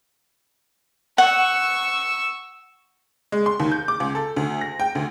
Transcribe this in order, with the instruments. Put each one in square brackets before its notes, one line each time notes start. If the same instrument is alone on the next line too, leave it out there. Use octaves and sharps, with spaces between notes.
[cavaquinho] F#5 [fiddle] C#6 E6
[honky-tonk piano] G#3
C6
D#2
G6
D6
C#2
A4
D2
A#6
G5
D2